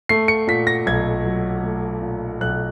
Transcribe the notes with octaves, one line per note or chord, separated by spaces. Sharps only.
A3 C7
C#7
A#2 B6
A#6
B1 G#6
F#3
A3
A#2
B1 F#6